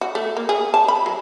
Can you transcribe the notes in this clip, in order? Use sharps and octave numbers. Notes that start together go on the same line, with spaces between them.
F#4
A3
A#3
G#4
A5
B5
F#3